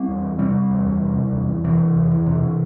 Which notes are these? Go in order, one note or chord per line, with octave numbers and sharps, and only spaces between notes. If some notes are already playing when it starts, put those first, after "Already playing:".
Already playing: G3 C4
E2
E2
C3 G3 C4
C3
E2
E2
C3
C3
E2
E2
C3 E3
C3
E2
E2
C3
C3